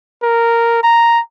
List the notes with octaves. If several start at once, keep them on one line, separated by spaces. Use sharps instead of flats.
A#4
A#5